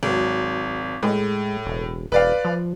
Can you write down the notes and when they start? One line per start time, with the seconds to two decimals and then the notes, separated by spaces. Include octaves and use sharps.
0.03 G#1 F#3
1.03 A2 G#3
1.65 E1
2.12 E1 B4 D5 F5
2.45 F3